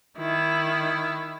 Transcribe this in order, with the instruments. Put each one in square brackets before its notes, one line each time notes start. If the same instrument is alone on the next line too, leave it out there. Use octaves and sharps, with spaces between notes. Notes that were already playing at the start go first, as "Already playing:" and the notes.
[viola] D#3 E4